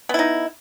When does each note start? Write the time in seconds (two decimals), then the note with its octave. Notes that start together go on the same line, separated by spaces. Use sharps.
0.09 B3
0.14 E4
0.19 D#4